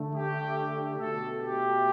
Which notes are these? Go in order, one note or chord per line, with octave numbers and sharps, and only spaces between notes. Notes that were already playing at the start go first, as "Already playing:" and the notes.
Already playing: D3 A3
G4
B2 A3 A4
G4